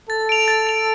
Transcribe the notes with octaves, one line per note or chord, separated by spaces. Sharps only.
A4 A6
D7 F7
A6
D7 F7